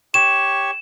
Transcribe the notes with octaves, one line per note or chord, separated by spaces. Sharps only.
G4 C#5 C#6 E7